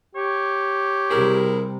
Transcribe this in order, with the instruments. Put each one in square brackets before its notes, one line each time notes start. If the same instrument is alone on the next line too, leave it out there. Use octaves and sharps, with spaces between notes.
[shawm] G4 [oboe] C#5
[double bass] C3 G3 [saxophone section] E4 G#4 A#4